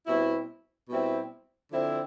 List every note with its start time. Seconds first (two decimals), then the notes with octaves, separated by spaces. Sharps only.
0.07 B2 G3 C4 E4
0.89 B2 G3 C4 E4
1.71 D3 F3 C4 E4